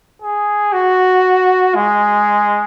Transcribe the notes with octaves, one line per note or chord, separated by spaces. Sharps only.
G#4
F#4
G#3